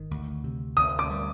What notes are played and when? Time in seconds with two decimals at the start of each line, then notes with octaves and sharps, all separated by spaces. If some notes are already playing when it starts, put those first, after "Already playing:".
Already playing: G#1 D#3
0.11 D2
0.44 C3
0.77 D2 D#6
0.99 D6
1.10 G3